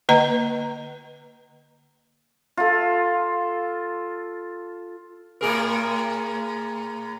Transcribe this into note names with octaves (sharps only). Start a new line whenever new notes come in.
D3 A#3 B4 D#5 A#5
F4 A4
A2 G#4 A#4